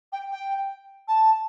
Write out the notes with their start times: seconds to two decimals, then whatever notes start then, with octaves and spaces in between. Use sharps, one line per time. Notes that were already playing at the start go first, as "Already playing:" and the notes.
0.12 G5
0.31 G5
1.08 A5